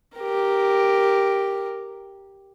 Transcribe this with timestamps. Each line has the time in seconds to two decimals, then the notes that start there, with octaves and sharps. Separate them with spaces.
0.17 G4 A#4